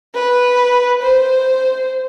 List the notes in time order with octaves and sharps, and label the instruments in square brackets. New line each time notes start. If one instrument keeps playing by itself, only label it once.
[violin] B4
C5